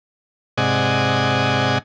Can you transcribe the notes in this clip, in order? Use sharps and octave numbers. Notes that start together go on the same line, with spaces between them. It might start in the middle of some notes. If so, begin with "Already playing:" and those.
G#2 C3 D5 D#5 F#5 G#5